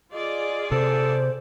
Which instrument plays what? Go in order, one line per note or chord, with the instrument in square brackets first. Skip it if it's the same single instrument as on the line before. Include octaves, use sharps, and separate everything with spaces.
[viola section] F4 G#4 D5 [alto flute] D#5
[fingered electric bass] C3 [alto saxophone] A4 [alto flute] C5